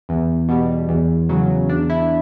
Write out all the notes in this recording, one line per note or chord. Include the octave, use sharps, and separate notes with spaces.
E2
B2 G3
E2
C#3 F#3
E2 D4
E4